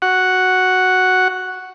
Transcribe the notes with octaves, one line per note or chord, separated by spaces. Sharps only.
F#4 F#5